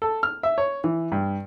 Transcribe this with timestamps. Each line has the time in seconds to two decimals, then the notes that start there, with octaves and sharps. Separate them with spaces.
0.02 A4
0.23 F6
0.43 E5
0.58 C#5
0.84 E3
1.12 G2